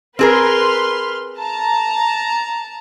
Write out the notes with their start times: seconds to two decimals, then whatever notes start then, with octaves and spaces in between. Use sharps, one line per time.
0.19 C4 G#4 A#4 B4 C6 F6
1.39 A5 A#5